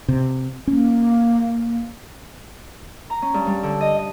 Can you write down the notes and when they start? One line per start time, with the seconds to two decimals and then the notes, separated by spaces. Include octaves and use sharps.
0.08 C3
0.67 A#3 C#4
3.10 A#5
3.22 C#4
3.34 G2
3.47 G3
3.63 D3
3.81 D#5
3.99 D#5